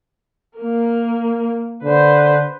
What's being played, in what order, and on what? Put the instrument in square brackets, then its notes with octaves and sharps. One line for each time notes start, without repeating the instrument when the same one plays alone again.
[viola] A#3 A#4
[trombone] D3 [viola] B4 C5